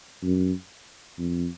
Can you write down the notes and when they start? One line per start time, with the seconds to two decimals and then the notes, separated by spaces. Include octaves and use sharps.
0.23 F#2
1.19 F2